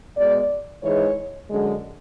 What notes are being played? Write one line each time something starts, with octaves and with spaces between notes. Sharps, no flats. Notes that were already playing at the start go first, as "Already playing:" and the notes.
B2 G#3 D5
G#2 E3 G#3 C#5
F#2 D3 G#3